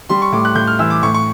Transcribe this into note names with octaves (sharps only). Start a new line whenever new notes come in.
G3 C6
C#6
A2 D6
F#6
A2 G6
F6
E3 E6
D6
A2 C#6
C#6